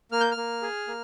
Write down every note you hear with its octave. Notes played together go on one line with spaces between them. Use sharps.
A#3 F6
G6
F6
A#3
G#4
A#3